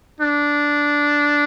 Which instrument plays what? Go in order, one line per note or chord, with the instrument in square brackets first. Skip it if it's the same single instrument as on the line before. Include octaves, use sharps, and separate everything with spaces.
[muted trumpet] D4